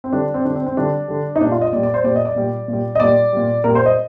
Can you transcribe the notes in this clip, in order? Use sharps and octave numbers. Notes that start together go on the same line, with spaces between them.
C4
D3 G3 D4
C4
D3 G3 D4
C4
C4
D3 G3 D4
D3 G3
D#4
A#2 G3 D4
F4
D#5
A#2 G3 D5
D5
C5
A#2 G3 D5
D#5
D5
A#2 G3
A#2
G3
D#5
A#2 G3 D5
A#2 G3
A#2 G3 A#4
C5
D#5